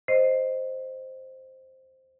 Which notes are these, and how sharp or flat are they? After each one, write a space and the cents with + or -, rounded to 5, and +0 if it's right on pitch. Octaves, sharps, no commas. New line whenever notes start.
C5 +0 D#5 +0